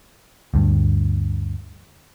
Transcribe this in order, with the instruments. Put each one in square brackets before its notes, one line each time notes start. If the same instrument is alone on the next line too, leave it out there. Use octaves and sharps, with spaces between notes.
[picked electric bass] D2 G2